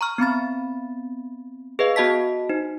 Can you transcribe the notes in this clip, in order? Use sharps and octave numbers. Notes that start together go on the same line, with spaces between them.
A#5 C#6 F6
B3 C4 B5 A6
G#4 B4 D#5 F5
B3 F#4 D#5 A5 B6
D#4 C5